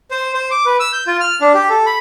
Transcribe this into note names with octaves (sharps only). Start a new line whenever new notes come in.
C5
C5
D6
B4
E6
G6
F4
F6
D4
G4
A4
B5